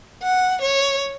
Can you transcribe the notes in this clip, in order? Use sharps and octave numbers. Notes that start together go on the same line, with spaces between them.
F#5
C#5